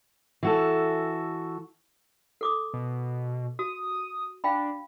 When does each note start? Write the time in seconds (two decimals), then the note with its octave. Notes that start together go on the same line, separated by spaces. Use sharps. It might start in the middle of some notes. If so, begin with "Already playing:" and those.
0.43 E3 F#4 A4
2.41 A4 D6 D#6
2.74 B2
3.59 F#4 D#6
4.44 D4 F5 G5 B5